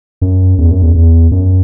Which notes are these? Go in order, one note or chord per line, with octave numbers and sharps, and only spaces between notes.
F#2
E2
F#2
E2
E2
F#2